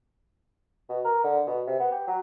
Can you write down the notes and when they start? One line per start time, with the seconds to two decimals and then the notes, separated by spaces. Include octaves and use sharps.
0.89 B2
1.05 A#4
1.24 D3
1.47 B2
1.67 C3
1.79 B3
1.92 G4
2.07 F#3